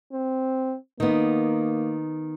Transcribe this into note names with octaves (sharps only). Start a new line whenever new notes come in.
C4
D#3 A#3 B3